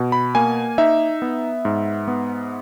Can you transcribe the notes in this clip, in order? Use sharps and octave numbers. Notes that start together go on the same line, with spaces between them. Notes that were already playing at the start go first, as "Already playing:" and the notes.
Already playing: B2
B5
A#3 G#5
D#4 E5
B3
G#2
B3